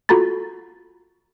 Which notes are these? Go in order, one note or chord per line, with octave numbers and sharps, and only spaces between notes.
F4 F#4 A4 A#5 B5 A6